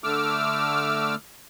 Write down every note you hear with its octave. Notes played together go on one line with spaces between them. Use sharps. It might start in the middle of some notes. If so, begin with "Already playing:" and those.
D3 A3 D6 E6 F6